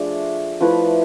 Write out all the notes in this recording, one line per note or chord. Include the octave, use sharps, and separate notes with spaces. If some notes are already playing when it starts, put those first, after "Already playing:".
Already playing: F3 A3 D4 G#4
F3 A3 E4 B4